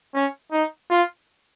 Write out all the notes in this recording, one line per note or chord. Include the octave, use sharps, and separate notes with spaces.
C#4
D#4
F4